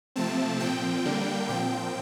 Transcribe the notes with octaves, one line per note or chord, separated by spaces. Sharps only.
C3 F3 A3 C4 A5
A#2 F3 C4 G5
D3 G3 A#3 D4
A#2 F3 C4 G5